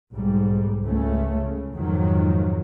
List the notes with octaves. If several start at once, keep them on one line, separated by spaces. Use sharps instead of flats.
B1 G#2 G3
C#2 C#3 A3 C#4
C#3
F2 G#2 D#3 F3 F#3